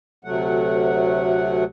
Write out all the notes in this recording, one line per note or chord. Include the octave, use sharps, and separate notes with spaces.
D2 C3 F#3 A3 F#5